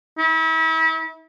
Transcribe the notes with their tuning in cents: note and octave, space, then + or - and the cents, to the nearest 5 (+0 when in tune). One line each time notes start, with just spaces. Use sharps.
E4 -40